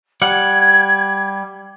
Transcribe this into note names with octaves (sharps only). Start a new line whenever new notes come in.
G3 F#5 G#6